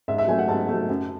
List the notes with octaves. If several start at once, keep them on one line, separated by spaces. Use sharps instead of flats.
G#2 E5
E5
F#3 A3 G#5
F#5
G#2 A5
F#3 A3
F#2